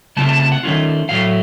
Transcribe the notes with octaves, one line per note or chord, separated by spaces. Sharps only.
C#3 A3 C4 F4 A5
A5
A5
F#5
D#3 A3 C#4 F4
A2 F#3 A3 F5